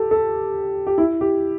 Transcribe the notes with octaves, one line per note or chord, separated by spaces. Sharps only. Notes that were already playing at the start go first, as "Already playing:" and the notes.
Already playing: G4 A4
A4
G4
E4
G4